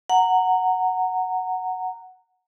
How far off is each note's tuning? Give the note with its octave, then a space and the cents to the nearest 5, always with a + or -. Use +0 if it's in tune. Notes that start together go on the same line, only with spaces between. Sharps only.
F#5 +0 A#5 -15